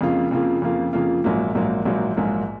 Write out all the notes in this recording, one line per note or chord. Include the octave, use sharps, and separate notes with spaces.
F2 C#3 F3 A#3 F4
F2 C#3 F3 A#3 F4
F2 C#3 F3 A#3 F4
F2 C#3 F3 A#3 F4
A#1 G#2 F#3 A#3
A#1 G#2 F#3 A#3
A#1 G#2 F#3 A#3
A#1 G#2 F#3 A#3